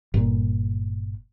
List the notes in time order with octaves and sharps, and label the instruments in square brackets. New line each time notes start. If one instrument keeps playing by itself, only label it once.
[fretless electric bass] G1 A#2